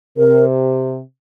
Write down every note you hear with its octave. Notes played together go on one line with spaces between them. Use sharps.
C3 A#4